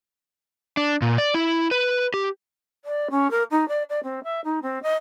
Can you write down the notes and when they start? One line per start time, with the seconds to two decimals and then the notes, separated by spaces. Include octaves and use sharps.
0.77 D4
1.02 A#2
1.18 D5
1.35 E4
1.71 B4
2.14 G4
2.84 D5
3.11 C#4
3.31 A#4
3.51 D#4
3.68 D5
3.90 D5
4.03 C4
4.24 E5
4.44 D#4
4.62 C4
4.83 D#5